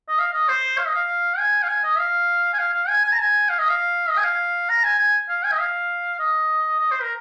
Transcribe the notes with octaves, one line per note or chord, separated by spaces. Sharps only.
D#5
F5
D#5
C5
F5
D#5
F5
G#5
F5
G#5
D#5
F5
G#5
F5
F5
G#5
G#5
A#5
G#5
F5
D#5
F5
D#5
G#5
F5
A#5
G#5
G#5
F5
G#5
D#5
F5
D#5
D#5
C5
A#4